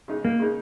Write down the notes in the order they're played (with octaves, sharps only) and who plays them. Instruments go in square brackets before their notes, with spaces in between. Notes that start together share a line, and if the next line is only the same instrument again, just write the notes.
[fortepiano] C#3 G#3 D#4
[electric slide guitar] A#3
[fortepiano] C#3 G#3 D#4